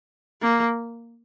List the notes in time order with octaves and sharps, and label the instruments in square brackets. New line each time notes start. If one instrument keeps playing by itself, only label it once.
[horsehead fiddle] A#3